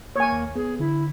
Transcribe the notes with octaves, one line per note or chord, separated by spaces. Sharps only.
A#3 C#5 G#5
D#2
B3 G#4
D3 E4